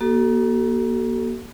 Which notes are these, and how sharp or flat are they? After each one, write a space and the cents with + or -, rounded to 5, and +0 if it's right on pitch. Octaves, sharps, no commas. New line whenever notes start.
A#3 +25 F#4 +40 A4 +0